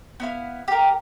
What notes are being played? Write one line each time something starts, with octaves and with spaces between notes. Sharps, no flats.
B3 E4 F5
G4 A#4